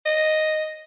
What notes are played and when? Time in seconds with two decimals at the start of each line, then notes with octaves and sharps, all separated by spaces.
0.06 D#5